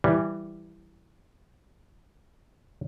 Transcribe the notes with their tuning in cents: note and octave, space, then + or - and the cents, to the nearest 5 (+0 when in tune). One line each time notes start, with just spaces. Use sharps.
E3 +0 G3 +0